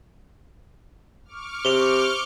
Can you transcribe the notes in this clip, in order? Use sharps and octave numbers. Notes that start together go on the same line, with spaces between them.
C#6 D6 F6
C3 F7 G7